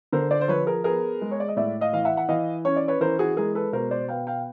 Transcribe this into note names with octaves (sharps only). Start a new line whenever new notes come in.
D3 A#4 C5
C5 D5
C5
F3 B4 C#5
G#4 A#4
B3 G#4 A#4
G#3
C#5
D5
D#5
A2 D5 E5
D#5 F5
E3 F5
E5 F#5
F#5
E3 D#5 F5
C#4 C#5
D5
B4 C#5
E3 A#4 C5
F#4 G#4
G#3 G#4 A#4
A4 B4
B2 A#4 C5
C5 D5
B3 F5 G5
F5 G5